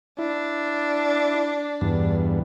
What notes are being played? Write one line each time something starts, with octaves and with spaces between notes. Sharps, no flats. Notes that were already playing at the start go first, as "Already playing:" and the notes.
D4 E4
E2 G2